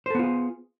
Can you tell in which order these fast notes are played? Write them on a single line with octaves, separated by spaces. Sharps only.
C5 A4 B3 F4 G#4